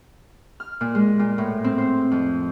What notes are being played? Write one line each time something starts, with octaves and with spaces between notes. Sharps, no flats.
F6
A#2
G#3
A#2
A2
C4
C5
F2